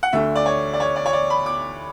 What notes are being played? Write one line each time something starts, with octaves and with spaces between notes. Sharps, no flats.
F#5
D2 D3 A3 E5
D5
C#5
D5
C#5
D5
C#5
D5
B5
D6